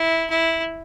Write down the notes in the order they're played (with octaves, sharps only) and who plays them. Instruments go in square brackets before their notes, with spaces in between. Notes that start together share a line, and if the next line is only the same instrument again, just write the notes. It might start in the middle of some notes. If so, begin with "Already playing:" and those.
Already playing: [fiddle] E4
E4